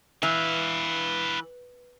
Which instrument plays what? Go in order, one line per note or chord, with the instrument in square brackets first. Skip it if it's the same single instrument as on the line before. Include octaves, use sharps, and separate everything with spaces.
[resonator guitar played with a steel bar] E3 [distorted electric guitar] B4 F5